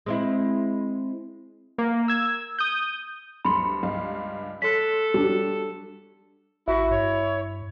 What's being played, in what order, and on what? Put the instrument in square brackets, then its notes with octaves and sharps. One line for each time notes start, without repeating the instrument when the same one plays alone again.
[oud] G#3 C4 E4
[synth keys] A#3
E6 G#6
D#6 G6
[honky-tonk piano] D2 G2 C#7 [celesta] B5 C6
[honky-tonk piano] C#2 G2 F5
[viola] A4 [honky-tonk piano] C#5 C6 F#6 [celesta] B6
[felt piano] G3 D4 F#4
[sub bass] G#1 [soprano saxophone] E4 [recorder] F#4 [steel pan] E5
[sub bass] G2 [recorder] C#5